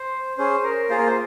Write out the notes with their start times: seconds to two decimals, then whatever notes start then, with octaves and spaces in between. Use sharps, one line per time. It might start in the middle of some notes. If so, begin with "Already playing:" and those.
Already playing: C5
0.37 C#4 G#4 C5
0.63 A#4
0.89 A#3 F4 G#4 C5
0.98 A#4
1.06 C5